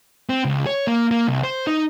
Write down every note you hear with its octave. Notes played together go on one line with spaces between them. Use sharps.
C4
C#2
C#5
A#3
A#3
C2
C5
D#4